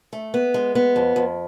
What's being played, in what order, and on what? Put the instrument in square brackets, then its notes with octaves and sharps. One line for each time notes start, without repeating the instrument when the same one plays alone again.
[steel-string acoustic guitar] A3
B3
G#3
B3
F2
F2